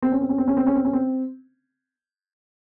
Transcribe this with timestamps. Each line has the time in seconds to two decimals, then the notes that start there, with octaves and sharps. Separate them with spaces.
0.02 C4
0.12 C#4
0.21 C4
0.29 C#4
0.38 C4
0.48 C#4
0.57 C4
0.67 C#4
0.75 C4
0.85 C#4
0.93 C4